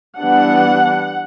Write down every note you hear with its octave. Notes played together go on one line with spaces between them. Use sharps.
E3 G3 B3 D4 F#5